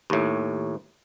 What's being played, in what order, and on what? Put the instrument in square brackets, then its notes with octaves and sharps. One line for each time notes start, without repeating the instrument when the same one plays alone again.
[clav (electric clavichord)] D#2 A2